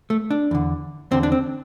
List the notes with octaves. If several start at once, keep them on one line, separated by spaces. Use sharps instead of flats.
A3
D4
E2 D3
E2 D3 C4
D4
C4